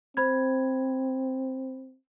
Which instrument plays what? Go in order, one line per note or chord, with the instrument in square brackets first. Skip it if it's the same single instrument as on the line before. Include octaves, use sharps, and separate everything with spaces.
[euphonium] C4 [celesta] C5 B5 G#6